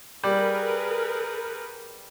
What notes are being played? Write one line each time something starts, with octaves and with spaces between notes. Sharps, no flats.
G3 G#4 A#4 B4